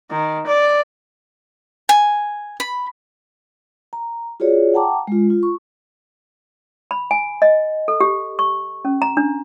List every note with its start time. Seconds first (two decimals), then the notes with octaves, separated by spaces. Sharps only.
0.11 D#3
0.47 D5
1.89 G#5
2.60 B5
3.93 A#5
4.40 F4 F#4 G#4 C#5 D5
4.74 F#5 G5 A5 A#5 D6
5.07 G#3 F4
5.30 F4
5.43 C#6
6.91 B5
7.11 G#5
7.42 D#5
7.88 A4
8.01 G4
8.39 C#6
8.85 C#4
9.02 A#5
9.17 D4